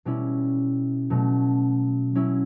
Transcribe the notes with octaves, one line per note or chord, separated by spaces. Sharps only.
B2 G3 C#4 E4
B2 F#3 A3 C#4
F#3 C#4 E4